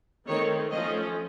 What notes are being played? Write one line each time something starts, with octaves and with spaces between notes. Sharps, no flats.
D#3 A3 C4 C#5
F3 A3 C#4 D#5